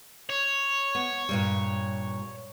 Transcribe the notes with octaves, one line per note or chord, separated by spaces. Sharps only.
C#5
B3
G2 A#2 G3